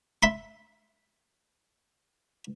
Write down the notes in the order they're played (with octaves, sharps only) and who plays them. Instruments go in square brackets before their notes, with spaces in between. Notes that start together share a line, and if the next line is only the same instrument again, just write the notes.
[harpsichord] E5 B5 C6